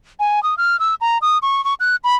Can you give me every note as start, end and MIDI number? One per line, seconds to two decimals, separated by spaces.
0.20 0.42 80
0.43 0.54 87
0.57 0.79 89
0.79 0.95 88
1.01 1.18 82
1.22 1.38 87
1.42 1.64 85
1.65 1.74 85
1.80 1.96 90
2.04 2.16 83